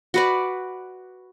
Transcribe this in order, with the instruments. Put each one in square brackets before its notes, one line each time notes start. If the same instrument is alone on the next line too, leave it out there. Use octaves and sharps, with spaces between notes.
[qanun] F#4 B4 D5